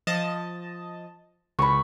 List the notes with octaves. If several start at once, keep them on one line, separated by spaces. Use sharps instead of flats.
F3 D#5 A5
C#2 B5 C#6